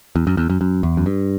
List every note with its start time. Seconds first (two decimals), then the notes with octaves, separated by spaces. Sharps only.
0.16 E2
0.27 F#2
0.37 E2
0.50 F#2
0.61 F#2
0.83 E2
0.97 F#2
1.06 G2